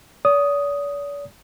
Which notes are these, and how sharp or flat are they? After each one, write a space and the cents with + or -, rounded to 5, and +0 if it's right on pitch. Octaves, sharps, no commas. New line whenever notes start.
D5 -45 D#6 +0